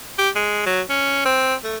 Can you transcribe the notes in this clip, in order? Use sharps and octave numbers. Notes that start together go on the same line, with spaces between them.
G4
G#3
F#3
C#4
C4
A3